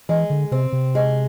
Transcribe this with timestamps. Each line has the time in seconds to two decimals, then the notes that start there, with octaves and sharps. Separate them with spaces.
0.09 E3 G#3
0.30 D3
0.51 C3 C4
0.73 C3
0.95 G#3